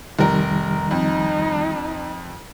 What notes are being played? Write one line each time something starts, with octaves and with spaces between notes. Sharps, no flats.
F1 D#3 G3 A#4
F2 D#4